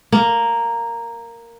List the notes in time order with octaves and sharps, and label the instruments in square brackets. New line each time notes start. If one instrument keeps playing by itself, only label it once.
[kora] A#3